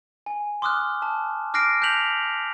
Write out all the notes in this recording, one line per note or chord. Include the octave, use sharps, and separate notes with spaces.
G#5
C6 D6 D#6 F6 F#6
A5
D6 F6 F#6 A#6 C7 D7
A5 F#6 G6 B6 F7 F#7